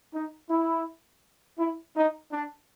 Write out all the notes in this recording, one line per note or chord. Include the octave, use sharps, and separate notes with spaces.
D#4
E4
E4
D#4
D4